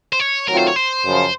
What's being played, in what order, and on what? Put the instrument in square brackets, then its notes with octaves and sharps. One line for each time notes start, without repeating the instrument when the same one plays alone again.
[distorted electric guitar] C5
C#5
[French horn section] D#3 F#3 A3 C4 F4 [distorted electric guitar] A#4
[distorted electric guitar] C5
C#5
C5
[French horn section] F#2 C#3 F3